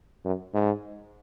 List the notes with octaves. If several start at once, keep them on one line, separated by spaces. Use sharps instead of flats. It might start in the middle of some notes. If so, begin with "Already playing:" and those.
F#2
G#2